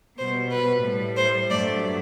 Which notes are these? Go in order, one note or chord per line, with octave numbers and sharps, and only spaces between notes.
B2 G3 C5
B4
A2 G3
C5
G2 F#3 A3 D5